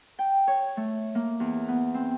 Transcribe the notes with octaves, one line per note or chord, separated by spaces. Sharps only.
G5
C#5
A3
A#3
E2
B3
C4